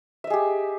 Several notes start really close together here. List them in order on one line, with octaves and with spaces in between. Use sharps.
E5 D#5 G#4 G4